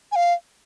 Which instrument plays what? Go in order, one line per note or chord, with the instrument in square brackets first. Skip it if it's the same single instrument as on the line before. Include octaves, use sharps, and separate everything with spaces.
[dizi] G#5
F5